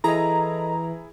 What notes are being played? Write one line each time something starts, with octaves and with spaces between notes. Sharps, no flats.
E3 E4 G#4 A4 D#5 A#5